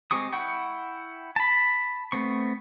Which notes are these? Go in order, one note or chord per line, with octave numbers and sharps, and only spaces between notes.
G#3 C4 G4 C#6 D#6
E4 F#5 G5 C#6
A5 B5
A3 B3 C4 C#6